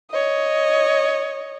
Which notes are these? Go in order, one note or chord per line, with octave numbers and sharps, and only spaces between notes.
C#5 D#5